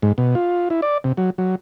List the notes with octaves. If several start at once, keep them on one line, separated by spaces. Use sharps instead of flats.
G#2
B2
F4
E4
D5
C3
F#3
F#3